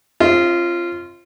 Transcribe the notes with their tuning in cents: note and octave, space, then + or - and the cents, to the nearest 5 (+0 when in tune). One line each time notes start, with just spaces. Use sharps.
C4 +40 F4 -15 D#5 +30